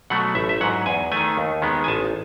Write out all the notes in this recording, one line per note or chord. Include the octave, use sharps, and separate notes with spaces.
B2 F#3 A3 F#5
A1 E5
E5
G#2 F#3 F#5
E2 G#5
D#3 A3 G#5
D#2
D#3 G#3 B3
G#5
A1 A5